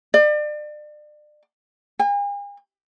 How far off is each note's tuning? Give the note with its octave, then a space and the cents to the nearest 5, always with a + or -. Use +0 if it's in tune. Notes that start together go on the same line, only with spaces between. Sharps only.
D5 +35
G#5 -45